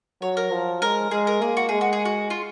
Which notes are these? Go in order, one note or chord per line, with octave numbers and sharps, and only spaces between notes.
F#3 C#5
A#4
F3
G#3 A#4
G#3 G#4
A#4
A#3 G#4
F#4
G#3 G#4
F#4
G#4
F#4
F4